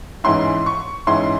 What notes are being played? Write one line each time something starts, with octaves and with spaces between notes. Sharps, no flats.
G#2 E3 G#3 C#4 E4 C6
C#6
G#2 E3 G#3 C#4 E4 C6